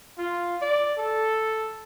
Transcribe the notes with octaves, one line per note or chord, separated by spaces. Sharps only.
F4
D5
A4